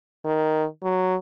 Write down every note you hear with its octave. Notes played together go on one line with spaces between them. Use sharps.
D#3
F#3